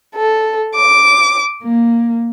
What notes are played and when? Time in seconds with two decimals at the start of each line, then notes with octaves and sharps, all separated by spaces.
0.15 A4
0.76 D6
1.63 A#3